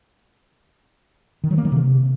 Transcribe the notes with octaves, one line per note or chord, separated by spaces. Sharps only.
D#3
F#3
A#3
D#3
C3